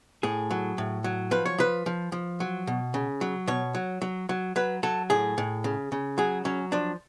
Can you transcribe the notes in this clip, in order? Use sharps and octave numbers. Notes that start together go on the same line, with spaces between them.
A2 G#4
F#3
A2
F#3
F3 B4
C#5
F3 B4
F3
F3
F#3
B2
C#3
F#3
B2 C#5
F#3
F#3
F#3
F#3 B4
F#3 A4
A2 G#4
A2
C#3
C#3
F#3 G#4
F#3 C#4
F3 D4